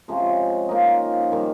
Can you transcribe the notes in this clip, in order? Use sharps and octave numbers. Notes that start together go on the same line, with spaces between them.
C3 F3 G#3 C#4
F3 A#3 D#4
D#3 G3